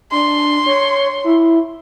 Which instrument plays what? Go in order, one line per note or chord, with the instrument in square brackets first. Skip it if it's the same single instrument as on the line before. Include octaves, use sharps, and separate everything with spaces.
[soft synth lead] D4 [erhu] C6
[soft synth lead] C#5
E4